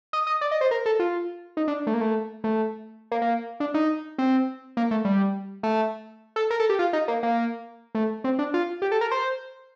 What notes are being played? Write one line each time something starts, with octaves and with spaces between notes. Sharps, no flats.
D#5
D#5
D5
D#5
C5
A#4
A4
F4
D#4
D4
A3
A#3
A3
A3
A#3
A#3
D4
D#4
C4
A#3
A3
G3
A3
A4
A#4
A4
G4
F4
D#4
A#3
A#3
A3
C4
D4
F4
G4
A4
A#4
C5